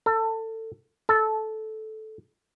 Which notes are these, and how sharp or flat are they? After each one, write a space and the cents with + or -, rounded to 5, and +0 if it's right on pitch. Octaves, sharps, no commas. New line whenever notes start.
A4 +25
A4 -10